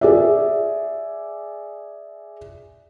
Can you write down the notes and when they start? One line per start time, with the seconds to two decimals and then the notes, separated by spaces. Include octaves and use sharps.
0.01 G#4 D5 E5